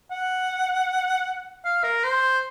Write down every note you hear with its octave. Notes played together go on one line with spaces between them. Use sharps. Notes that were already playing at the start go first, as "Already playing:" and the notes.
F#5
F5
A#4
C5